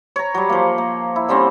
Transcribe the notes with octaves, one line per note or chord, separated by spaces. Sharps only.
C#5 A#5
F#3 G3
F3 A#3
A#3
E4
D3 G3 C4 C#4